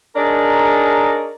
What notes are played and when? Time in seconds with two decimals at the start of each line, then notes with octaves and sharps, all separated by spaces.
0.16 D4 D#4 G#4 A#4 C#5 D5